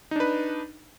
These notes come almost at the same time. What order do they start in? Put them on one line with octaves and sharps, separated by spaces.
D#4 D4 B4